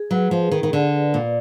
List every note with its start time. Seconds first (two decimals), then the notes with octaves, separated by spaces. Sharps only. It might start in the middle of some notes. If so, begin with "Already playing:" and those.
Already playing: G#4
0.11 F#3 B4
0.31 F3 G#4
0.51 D#3 G#4
0.63 D#3
0.73 D3 D5
0.93 B4
1.14 A#2 D5